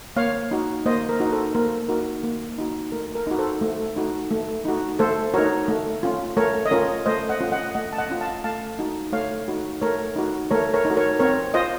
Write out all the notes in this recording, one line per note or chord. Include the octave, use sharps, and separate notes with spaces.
A#3 C#5 F5
D#4 F#4
A#3 C5 D#5
A#4
D#4 F#4
A4 C5
A#3 A#4
D#4 F#4 A#4
A#3
D#4 F#4
A3 A#4
A#4
D#4 F#4
A4 C5
A3
D#4 F#4
A3
D#4 F#4
A3 A4 C5
D#4 F#4 A#4 C#5
A3
C#4 F4
A3 A#4 C#5
D#5
C#4 F4 A#4 C#5
A3 C5 D#5
D#5 F#5
C#4 F4
D#5 F#5
A3 D#5 F#5
A5
D#5 F#5
C#4 F4
F5 A5
A3 F5 A5
D#4 F#4
A3 C#5 F5
D#4 F#4
A3 A#4 C#5
D#4 F#4
A3 A#4 C#5
A#4 C#5
D#4
F#4
A#4 C#5
C4 A#4 C#5
F4 C5 D#5